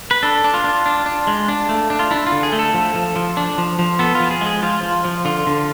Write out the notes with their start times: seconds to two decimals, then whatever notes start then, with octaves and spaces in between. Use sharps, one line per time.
0.11 B4
0.23 D4 A4
0.44 D4
0.54 F4
0.64 D4
0.86 D4
1.06 D4
1.27 G#3
1.48 D4
1.69 A3
1.90 D4
1.99 F4
2.11 D4 E4
2.27 F4
2.32 D3
2.43 G#4
2.52 A3
2.59 A4
2.74 F3
2.95 F3
3.16 F3
3.37 D4
3.58 F3
3.79 F3
3.99 B3 A4
4.15 F3 F4
4.31 G#4
4.41 G#3
4.47 G#4
4.62 F3 F4
4.83 F3
5.05 F3
5.25 D3 F4
5.47 D3